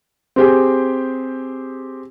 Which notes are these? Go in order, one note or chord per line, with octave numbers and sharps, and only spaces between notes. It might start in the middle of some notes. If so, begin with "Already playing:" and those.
C4 G4 G#4